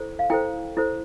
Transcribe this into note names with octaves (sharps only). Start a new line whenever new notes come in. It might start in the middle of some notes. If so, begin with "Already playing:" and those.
Already playing: E4 A4 C5
F5
E4 A4 C5 G5
E4 A4 C5